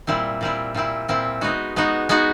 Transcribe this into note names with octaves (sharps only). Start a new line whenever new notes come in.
A#2 G3 C4 E4
A#2 G3 C4 E4
A#2 G3 C4 E4
A#2 G3 C4 E4
G#3 B3 D#4 F#4
G#3 B3 D#4 F#4
G#3 B3 D#4 F#4